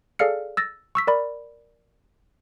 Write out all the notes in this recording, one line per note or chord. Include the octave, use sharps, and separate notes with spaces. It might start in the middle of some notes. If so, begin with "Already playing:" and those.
G#4 A4 D5 F5 F6 C#7
E6 A6 A#6
C#6 E6 B6
A#4 D5 B5